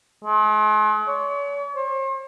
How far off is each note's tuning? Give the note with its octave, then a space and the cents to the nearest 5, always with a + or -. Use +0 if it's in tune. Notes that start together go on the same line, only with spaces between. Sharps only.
G#3 +45
C#5 +40
C5 +45